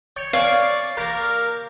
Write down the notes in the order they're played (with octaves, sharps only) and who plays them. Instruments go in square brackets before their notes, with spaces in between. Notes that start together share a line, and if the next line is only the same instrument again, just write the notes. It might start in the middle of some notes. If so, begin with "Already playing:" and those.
[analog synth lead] C#5 [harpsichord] G5
[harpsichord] C#5 G#5 C#6 [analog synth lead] D5 [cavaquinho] F5
[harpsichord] A#3 G4 [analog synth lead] A#4